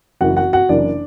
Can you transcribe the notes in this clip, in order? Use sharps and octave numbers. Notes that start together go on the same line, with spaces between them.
F#1 F#2 E3 F#4 F#5
F#4 F#5
F#4 F#5
F#1 F#2 E3 D4 D5